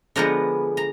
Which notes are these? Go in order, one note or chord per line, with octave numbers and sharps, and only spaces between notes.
D3 F3 G#3 B3 A#5
A#5